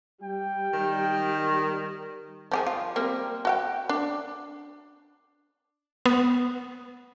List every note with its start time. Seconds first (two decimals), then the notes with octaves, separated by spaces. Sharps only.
0.23 G3 G5
0.73 D#3
2.52 F3 G4 G#4
2.67 F4
2.96 G3 A#3 C4
3.45 F#4 F5 G5
3.89 D4
6.06 B3